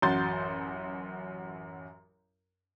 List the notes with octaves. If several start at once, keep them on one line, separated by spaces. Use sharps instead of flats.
A1 F#2 F#4 C6 G6 A6